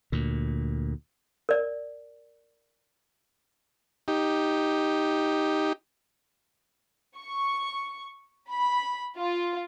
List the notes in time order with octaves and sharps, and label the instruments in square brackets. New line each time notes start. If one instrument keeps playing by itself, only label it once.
[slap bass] D2 A#2
[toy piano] A#4 D5
[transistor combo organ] D#4 G4
[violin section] C#6
B5
F4